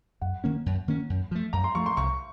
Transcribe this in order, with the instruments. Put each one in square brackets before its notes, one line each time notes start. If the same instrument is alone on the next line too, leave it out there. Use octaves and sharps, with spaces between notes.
[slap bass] F#2 [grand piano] F#5
[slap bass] D#3 A#3 C#4
F#2
D#3 A#3 C#4
F#2
F3 A3
[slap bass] F#2 [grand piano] A#5
[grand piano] C6
[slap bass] F3 A3 [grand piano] C#6
[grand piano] C6
[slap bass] C2 [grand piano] C#6